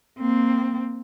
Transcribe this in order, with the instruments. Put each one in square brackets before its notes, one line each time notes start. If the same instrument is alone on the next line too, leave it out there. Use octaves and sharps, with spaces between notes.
[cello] A#3 C4